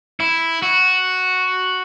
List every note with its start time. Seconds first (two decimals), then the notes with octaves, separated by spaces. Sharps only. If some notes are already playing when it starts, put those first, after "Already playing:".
0.20 E4
0.62 F#4